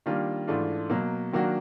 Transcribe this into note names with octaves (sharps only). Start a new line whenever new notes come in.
D#3 G3 A#3 D4 F4
G#2 E3 A3 D4 F4
B2 F#3 A#3
D#3 F#3 A#3 D4 F#4